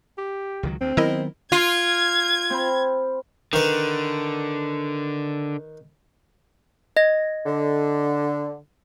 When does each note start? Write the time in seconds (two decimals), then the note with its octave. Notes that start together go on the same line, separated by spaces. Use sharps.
0.18 G4
0.63 C#2 D#3 F#3
0.81 D2 C4
0.97 D#3 F#3 B3 E4 A#4 D#5
1.52 F4 G#6
2.50 C4 C5 B5
3.53 D3 D#3 B4
6.97 D#5 A#6
7.46 D3